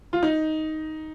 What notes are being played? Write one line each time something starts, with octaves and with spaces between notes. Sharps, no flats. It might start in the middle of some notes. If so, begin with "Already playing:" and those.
F4
D#4